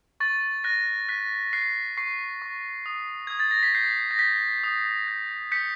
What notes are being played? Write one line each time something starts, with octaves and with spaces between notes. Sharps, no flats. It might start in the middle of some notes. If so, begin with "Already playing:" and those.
C#6 A6
F#6 A#6
F#6 B6
F#6 C7
C#6 C7
C#6
D#6
D#6 G#6
A6
A#6
B6
G6 C7
A#6
G6 B6
D#6
G6
G6 B6 C#7